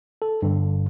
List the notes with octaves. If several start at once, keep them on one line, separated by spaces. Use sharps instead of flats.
A4
G2 D3